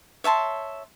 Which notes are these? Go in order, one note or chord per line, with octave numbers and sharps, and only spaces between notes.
C#5 E5 A5 C6